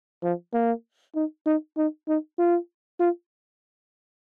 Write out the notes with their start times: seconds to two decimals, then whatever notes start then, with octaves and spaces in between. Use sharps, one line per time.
0.24 F3
0.54 A#3
1.15 D#4
1.46 D#4
1.77 D#4
2.08 D#4
2.39 F4
3.00 F4